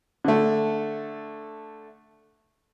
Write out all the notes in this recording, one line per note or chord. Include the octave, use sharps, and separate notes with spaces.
D3 A3